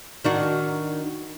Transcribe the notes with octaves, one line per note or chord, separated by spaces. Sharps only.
D#3 D4 F#4